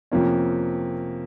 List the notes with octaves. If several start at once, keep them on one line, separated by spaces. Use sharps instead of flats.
F2 C3 F3 A#3 C#4